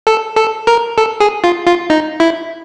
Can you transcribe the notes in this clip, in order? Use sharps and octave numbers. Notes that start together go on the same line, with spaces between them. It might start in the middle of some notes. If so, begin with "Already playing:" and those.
A4
A4
A#4
A4
G#4
F4
F4
D#4
E4